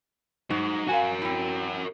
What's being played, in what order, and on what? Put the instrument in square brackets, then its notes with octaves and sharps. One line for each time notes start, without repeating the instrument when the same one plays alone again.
[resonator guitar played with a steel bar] F#3 [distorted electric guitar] D#4 C5
[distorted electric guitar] F#4 A#4 [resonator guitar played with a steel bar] F5 G#5
[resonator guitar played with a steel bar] C4 E4